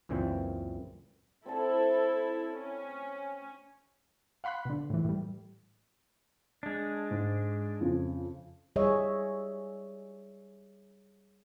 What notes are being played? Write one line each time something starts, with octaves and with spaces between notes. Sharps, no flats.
C#2 F#2 A#2 E3 C4 G5
C4 E4 A4 D5 A5
C#4
F5 F#5 B5 C6 F#6
B2 D3
A2 E3
A2 G3
G#3 D4
G#2
F2 C#3
G3 G#4 C#5 D#5 E5